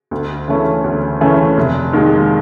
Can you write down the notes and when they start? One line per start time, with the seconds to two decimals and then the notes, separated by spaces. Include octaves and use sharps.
0.11 D2
0.48 C#3 E3 A3 C#4
0.84 D2
1.21 C#3 E3 A3 C#4
1.57 F1
1.93 D#2 D#3 G#3